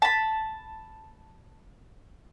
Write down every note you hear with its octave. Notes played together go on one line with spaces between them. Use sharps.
A5 B5